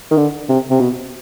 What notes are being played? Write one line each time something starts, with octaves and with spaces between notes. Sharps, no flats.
D#3
D3
C3
C3
B2